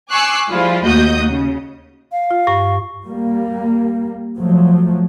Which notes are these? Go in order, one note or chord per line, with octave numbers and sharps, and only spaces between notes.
G#5 C#6 D6 E6 F#6 C7
F3 G3 E4 F4 G#4
D#2 A3 F#4 D#5 D#6 G6
C#3
F5
F4
G2 C#6
G3 A#3
F3 F#3 A3